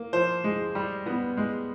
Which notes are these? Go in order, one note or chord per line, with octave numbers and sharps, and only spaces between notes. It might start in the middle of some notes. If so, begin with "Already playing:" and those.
Already playing: A#3
F3 C5
G#3
G3
B3
G#3